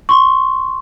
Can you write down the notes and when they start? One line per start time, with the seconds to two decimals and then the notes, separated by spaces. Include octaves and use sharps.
0.09 C6 C#6